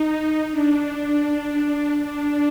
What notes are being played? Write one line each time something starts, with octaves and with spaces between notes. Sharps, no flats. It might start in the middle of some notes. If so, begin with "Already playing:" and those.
Already playing: D#4
D4
D4